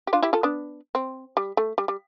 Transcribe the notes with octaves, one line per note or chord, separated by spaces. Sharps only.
G4
D4 F4
E4 G4
F4 A4
B3 D4
C4
G3
A3
G3
G3